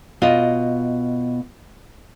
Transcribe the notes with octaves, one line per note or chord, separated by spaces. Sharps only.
B2 F4 D#5